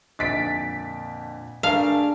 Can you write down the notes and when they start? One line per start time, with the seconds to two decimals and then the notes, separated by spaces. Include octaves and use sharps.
0.19 F2 A#2 D3 A6 B6 D7
1.63 A3 D4 G#4 A#4 F5 A5